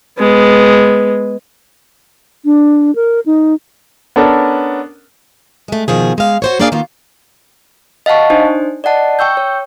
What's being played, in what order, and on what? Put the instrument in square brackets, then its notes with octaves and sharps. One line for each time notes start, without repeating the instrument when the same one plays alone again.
[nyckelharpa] G#3 B3
[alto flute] D4
A#4
D#4
[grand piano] B3 C#4 D4 A4 A#4
[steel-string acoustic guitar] G#3 A3
B2 D#3 F3 G#4
G#3 F5
F#4 C5 C#5
A#3 D4 G#4 D5 D#5 F5
D#3 A#3 B3 F4
[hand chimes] D#5 F5 F#5 A5 C#6
D4 D#4 C5
D5 D#5 F#5 A5
G5 C#6 E6 G6
C#5